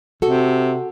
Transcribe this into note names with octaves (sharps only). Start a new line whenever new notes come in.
C3 F#4 A4